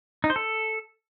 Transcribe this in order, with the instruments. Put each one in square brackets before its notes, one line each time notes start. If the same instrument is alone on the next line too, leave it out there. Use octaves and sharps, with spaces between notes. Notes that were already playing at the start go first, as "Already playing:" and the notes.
[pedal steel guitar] D#4
C5
A4